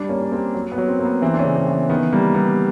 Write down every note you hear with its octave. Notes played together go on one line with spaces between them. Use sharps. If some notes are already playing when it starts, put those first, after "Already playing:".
Already playing: G3 D4
A#3 C#4
C#4
A#3 C4
F#3
B3
F#3
C4
A#3
B3
E3 C4
D4
C#4
C#3
C4
E3
B3
D#3 B3
G3 A#3
G3 B3